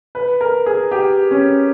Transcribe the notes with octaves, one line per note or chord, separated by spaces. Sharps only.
B4
A#4
G#4
G4
C#4